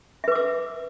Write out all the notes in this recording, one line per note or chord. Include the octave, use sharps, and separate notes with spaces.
B4 E5 D6 E6